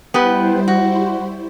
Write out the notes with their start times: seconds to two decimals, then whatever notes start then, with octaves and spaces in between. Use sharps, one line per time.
0.14 G3 B3 E4 G4 B4 C5
0.68 F#4